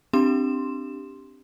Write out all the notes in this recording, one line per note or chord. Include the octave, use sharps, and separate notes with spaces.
C4 D4 G4 C6 E7